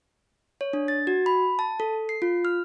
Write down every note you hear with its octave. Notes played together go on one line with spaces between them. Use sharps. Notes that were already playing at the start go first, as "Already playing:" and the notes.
C#5
D4
A6
F#4
B5
A5
A4
C7
F4
F6